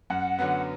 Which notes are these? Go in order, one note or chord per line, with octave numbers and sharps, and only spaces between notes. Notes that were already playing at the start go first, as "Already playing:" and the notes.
F#2 F#5
D3 F#3 B3